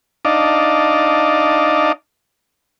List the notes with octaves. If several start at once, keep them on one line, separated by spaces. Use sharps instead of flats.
D4 D#4 D5 D#5 F5 A5